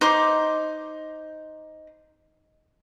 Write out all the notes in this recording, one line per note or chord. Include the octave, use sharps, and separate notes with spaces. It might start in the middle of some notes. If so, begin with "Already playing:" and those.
D#4 C5 D6